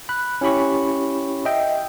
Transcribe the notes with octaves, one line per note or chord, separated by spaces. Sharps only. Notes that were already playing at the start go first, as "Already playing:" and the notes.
B5 F#6
C#4 E4 G4 B5 C#6
D#5 E5 G5